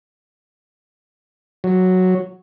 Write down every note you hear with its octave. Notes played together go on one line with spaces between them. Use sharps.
F#3